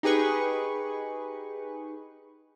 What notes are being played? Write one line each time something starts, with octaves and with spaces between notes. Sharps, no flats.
D#4 G4 G#4 B4 C#6